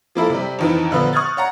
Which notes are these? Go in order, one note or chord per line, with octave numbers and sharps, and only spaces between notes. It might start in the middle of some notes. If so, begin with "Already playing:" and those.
F3 A#3 E4 A4
C3 G3
F2 D#3 E3
A#2 D3 F3 B3
C#6 D#6 F6 F#6 G#6 A6
C#5 F#5 A#5